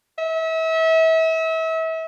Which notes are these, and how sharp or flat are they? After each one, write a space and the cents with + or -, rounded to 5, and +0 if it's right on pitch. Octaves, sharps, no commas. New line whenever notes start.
E5 -35